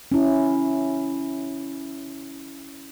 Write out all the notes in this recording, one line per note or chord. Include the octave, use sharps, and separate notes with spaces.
C#4 E4